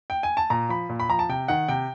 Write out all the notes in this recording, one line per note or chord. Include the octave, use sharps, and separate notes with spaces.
G5
G#5
A5
A#2 A#5
F3 B5
A#2
B5
F3 A#5
A5
C3 G5
D#3 F#5
C3 G5